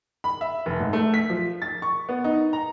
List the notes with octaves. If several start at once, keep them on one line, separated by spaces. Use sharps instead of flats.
B5
E5
F1
G#2
A3
B6
F3
A6
C#6
B3
D#4
A#5